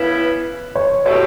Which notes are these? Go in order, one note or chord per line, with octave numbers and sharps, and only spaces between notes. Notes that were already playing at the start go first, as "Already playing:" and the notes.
Already playing: C#3 E3 B3 E4 B4
C#5
B2 A3 E4 G4 C#5